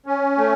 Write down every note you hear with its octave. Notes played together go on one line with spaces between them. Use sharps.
C#4
A3